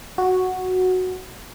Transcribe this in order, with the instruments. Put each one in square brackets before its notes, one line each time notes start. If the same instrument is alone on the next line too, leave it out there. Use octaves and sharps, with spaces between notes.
[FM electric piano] F#4